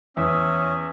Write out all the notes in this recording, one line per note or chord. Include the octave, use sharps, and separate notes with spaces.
E2 C#4 E5 D#6